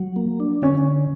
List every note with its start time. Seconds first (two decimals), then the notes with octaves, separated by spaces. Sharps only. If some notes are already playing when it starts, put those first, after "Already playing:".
Already playing: F#3
0.16 A#3
0.40 D4
0.62 D3 C#4